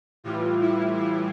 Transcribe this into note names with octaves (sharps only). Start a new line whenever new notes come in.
A2 E3 G3 F4
E4
E4